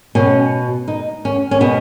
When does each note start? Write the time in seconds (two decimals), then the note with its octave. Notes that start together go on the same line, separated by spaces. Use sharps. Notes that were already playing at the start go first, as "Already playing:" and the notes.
0.15 B2 C#4
0.88 D#4
1.25 C#4
1.51 C#4
1.61 B2 B3